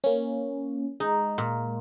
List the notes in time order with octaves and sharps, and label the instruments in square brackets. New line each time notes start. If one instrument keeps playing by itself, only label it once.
[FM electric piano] A#3 C#4
[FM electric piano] G#3 [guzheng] D#4
[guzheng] A#2